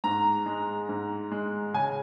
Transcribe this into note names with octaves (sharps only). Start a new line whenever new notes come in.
G#2 A#5
G#3
G#2
G#3
C#3 G#5